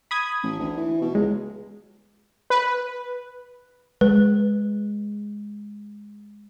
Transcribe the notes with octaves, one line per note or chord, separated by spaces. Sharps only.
B5 D#6 G#6
A1
D2
E3
B2
C#2 G#3
B4
G#3 B4